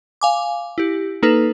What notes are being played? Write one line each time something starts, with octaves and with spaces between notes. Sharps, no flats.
F5 G#5 D6
E4 G4
A#3 D#4 A4 B4